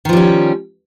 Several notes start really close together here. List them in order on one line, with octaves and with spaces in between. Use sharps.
D#3 F3 G3 C#4